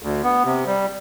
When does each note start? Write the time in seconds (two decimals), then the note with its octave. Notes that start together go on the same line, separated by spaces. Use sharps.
0.03 D2
0.23 B3
0.45 C3
0.66 G3